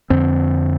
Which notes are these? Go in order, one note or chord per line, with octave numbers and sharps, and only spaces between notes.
F2 D3 C4